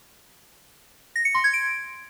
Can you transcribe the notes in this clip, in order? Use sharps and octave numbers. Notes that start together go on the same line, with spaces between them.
A#6
C#7
C6
G#6
D7